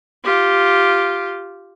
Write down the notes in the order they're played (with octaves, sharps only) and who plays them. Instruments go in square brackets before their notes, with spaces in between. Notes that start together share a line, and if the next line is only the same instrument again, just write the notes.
[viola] F4 G4